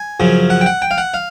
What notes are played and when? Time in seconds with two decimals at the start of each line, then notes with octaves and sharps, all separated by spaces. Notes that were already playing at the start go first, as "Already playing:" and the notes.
Already playing: G#5
0.20 F#2 C#3 F3
0.50 F#5
0.61 G5
0.66 F#5
0.82 G5
0.91 F5
0.98 F#5
1.14 F5